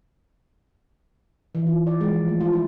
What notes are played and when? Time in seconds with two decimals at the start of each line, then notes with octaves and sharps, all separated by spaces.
1.55 E3
1.67 F4
1.87 D5
2.01 G#3
2.14 F3
2.29 A3
2.41 F4
2.53 E4